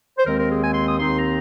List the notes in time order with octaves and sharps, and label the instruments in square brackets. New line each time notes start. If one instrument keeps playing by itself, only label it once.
[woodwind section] C5
D#2 D#3 G#3 C4 A#4
A#4
G#4
G#5
C6
D#6
D#2 D#3 C4 D#4 C6
A#5